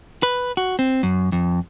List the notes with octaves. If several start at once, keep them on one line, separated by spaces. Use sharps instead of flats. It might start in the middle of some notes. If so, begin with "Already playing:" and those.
B4
F#4
C4
F#2
F2